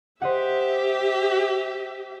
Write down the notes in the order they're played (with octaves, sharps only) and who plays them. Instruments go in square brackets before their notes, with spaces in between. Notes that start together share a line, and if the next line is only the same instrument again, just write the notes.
[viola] G4 E5 [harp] C5 D#5 F#5